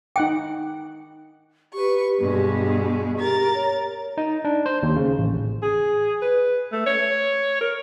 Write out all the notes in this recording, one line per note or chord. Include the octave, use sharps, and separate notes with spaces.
D#4 F#5 G5 D6
G4 B4 C#6
G2 B2 G#3
G4 A#4 A6
C#5
D#4
D4
C5
D#2
C#3
A1
G#4
B4
A3
C#5
A#4